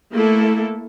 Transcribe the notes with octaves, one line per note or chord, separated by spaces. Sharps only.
A3 A#3 E4 A4